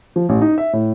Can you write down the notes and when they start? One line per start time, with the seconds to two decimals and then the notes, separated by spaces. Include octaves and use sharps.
0.16 F3
0.29 A1
0.41 D#4
0.58 E5
0.73 A2